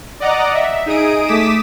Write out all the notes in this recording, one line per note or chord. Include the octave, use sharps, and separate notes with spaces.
D5 D#5 F#5 A#5 D6
E5
D#4 G#4 D#6 D7
A3 D6 D#6 B6 E7